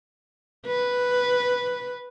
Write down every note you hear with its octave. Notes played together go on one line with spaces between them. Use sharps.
B4